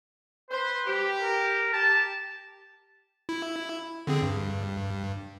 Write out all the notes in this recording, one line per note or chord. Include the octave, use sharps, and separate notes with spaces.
B4 C5
G4
A#4
G4 A5
E4
D3 C4 G#4
G2